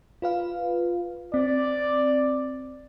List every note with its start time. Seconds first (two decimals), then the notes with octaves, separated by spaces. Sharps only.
0.22 F4 B4 F5
1.34 C4 D5